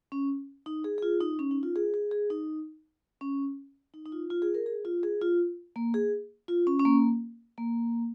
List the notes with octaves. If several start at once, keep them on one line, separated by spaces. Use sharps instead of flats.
C#4
D#4
G#4
G#4
F4
D#4
C#4
D#4
F4
G#4
G#4
G#4
D#4
C#4
D#4
D#4
F4
F4
G#4
A#4
G#4
F4
G#4
F4
A#3
G#4
F4
C#4
C#4
A#3
A#3